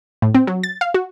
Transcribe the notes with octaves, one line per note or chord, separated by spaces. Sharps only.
A2
C4
F#3
A6
F5
F#4